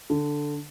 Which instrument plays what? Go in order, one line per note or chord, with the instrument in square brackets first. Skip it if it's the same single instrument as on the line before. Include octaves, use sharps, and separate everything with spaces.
[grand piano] D3